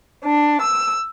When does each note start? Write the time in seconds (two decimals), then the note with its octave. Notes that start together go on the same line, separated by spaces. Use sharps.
0.24 D4
0.63 E6